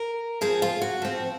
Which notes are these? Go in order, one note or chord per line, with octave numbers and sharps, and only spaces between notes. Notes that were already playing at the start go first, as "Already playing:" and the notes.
Already playing: A#4
F3 C4 G#4
F4
F#4
F3 C4